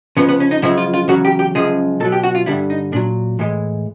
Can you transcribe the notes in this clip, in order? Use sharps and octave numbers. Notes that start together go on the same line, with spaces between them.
F2 C#3 F3 B3
B3
C#4
D#4
F#2 C#3 F3 G#3 E4
F4
F4
E2 C#3 F#3 F#4
G4
G4
F#2 C#3 F3 G#3 G#4
B2 F#3 A4
G4
F#4
F4
G2 D3 G3 E4
D#4
A#2 F#3 D4
A2 E3 G#3